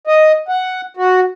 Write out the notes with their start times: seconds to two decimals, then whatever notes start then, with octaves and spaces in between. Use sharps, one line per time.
0.07 D#5
0.48 F#5
0.97 F#4